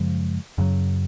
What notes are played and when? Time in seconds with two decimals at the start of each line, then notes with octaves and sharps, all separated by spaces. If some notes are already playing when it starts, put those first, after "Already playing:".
Already playing: F#2 C#3 F3 G#3
0.58 F#2 C#3 F#3